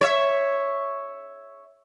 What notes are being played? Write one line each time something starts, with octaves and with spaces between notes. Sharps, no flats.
C#5 E5